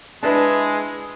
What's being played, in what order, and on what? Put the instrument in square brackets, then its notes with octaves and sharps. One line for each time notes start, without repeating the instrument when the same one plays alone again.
[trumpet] G#3 [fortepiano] D4 B4 [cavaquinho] E4 A5